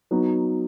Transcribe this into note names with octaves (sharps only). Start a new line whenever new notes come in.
F#3 B3 D#4